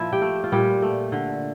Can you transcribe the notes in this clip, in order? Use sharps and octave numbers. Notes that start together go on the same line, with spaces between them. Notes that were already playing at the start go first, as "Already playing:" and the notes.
Already playing: A#2 F3 E4 E5
G4 G5
A3
F4
A#2 G3 G4
A3
D3